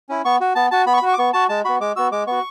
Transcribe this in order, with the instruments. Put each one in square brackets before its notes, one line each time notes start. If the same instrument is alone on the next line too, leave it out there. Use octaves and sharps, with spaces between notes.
[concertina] C#4 E4
B3 C#6
F#4
B3 A5
F#4 A5
B3 B5
C#6
B5
F#4
C#6
D6
B3 C#6
F#4 A5
G#3 A5
B3 F#4 B5
G#3 D6
B3 F#4 E6
G#3 D6
B3 F#4 C#6